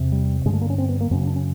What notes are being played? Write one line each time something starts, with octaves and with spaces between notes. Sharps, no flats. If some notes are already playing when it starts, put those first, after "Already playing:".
Already playing: E2 C3
G3
G2 D3 G#3
A3
A#3
C#4
C4
B3
A#3
F#2 C#3 C4 C#4
D4
C#4